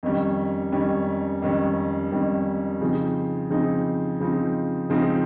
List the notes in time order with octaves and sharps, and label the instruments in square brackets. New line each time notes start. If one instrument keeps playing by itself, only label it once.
[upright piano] F2 D#3 G3 C#4
F2 D#3 G3 C#4
F2 D#3 G3 C#4
F2 D#3 G3 C#4
C#3 F3 C4 D#4
C#3 F3 C4 D#4
C#3 F3 C4 D#4
C#3 F3 C4 D#4